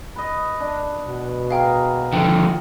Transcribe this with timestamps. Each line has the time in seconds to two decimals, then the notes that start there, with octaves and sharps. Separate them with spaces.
0.16 B4 D#5
0.60 D4
1.07 B2
1.51 G#4 A#4 F5 G5
2.13 D3 D#3 F3 G5